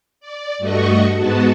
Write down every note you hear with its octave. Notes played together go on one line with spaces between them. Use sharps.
D5
G2 A3 F#4 D#5 C#6
G#2 G#3 B3 F#4 A5